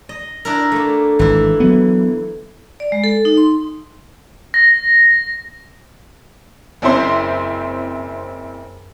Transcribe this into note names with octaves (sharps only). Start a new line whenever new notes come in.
D#5
D4 E4 A#4
A3 A#3
G#1 E3 E4
F#3 B3
D5
G#3
A4
D#4
C6
A#6
F#1 C4 C#4 E4 C5 C6